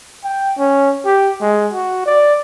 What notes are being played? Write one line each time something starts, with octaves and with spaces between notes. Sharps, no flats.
G5
C#4
G4
G#3
F#4
D5